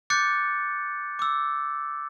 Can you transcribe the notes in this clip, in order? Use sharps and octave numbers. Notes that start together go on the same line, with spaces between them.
D6 F#6 G6 A6 C#7
D6 E6